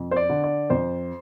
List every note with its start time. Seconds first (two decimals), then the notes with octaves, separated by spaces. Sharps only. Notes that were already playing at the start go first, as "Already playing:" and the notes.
Already playing: F2
0.11 C5
0.16 D5
0.30 D3
0.44 D5
0.70 F2 C5